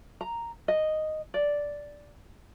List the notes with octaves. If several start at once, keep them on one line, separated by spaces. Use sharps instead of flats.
A#5
D#5
D5